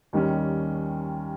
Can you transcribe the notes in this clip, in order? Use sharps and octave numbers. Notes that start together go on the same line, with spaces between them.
D#2 D#3 G3 C#4